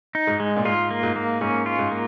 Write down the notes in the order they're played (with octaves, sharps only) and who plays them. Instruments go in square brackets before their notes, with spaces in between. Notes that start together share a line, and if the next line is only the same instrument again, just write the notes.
[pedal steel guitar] D#4
[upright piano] G#2
[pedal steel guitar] G#3
[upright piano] A#2
[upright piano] G#2 [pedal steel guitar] F4
[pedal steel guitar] A#3
[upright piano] G#2
[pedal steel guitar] A#3
[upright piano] G#2 [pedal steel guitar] C#4
[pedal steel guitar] F4
[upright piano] G#2
[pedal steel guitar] A#3